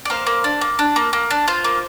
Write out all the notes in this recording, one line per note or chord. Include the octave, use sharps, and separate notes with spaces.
D5
A#3 C5 F5
A#3
D4
A#3
D4
A#3
A#3
D4
F4 C5
A#3